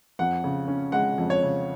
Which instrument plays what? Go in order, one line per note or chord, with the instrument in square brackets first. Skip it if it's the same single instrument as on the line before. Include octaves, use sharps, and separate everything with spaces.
[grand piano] F2 F#5
C#3
C#4
G#3 F#5
F2
C#5
C#3